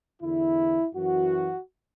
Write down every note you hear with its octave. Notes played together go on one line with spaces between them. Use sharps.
E2 D3 E4
F#2 E3 F#4